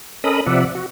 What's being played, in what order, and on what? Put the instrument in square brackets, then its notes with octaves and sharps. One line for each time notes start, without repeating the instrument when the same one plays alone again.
[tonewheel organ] C#4 A4 A#4 D#5 B5 D#6
C3 F3 D5 E5 F#5
F#4